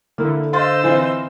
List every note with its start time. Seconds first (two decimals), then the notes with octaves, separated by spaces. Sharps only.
0.18 D3 A#3 E4
0.53 C5 D#5 F5 C6 E6 A6
0.83 E3 C4 F4